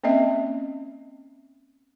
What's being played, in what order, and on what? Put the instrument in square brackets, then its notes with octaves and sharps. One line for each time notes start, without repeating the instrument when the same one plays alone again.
[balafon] A#3 C4 C#4 D#5 E5